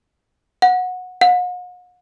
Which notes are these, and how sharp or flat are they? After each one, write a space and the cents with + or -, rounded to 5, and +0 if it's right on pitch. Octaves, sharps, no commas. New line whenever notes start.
F#5 -20
F#5 -45